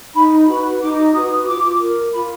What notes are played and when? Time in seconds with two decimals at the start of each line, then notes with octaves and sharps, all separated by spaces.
0.14 D#4 B5
0.47 F#4 B4 B5
0.80 D#4 D6
1.14 F#4 B4 D#6
1.46 F4 D6
1.80 A#4
2.13 F4 B5